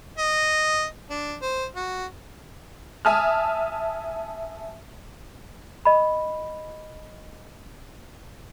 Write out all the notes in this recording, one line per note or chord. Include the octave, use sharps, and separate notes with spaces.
D#5
D4
C5
F#4
E5 G#5 A5 D#6 F6
D#5 B5